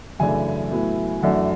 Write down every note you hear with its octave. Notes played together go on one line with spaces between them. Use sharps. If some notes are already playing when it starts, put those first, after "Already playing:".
F#2 C#3 E3 A3 D4 G#5
A2 F#3 B3 E4
F#2 E3 A3 D4 F#5